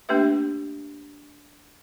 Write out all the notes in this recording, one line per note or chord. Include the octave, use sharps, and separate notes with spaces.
A3 A#3 D4 G4 B4 E5